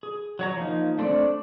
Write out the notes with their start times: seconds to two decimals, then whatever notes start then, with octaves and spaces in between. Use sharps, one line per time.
0.03 G#4
0.39 F#3 C#5 A#5
0.57 F3 A#3 D#4
0.99 A3 C4 D4 A4 D5